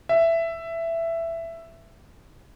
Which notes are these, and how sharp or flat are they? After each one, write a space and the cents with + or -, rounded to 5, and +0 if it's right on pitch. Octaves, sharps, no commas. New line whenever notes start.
E5 +10